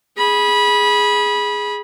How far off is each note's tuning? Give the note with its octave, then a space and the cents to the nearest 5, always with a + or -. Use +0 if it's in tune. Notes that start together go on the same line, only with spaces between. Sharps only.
G#4 +0 B5 -20